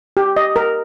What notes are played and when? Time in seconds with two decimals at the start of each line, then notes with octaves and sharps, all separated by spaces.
0.17 G4
0.37 D#5
0.56 A#4